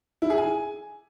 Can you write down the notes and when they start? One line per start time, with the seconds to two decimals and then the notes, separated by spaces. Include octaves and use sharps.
0.22 E4
0.30 G#4
0.38 G#5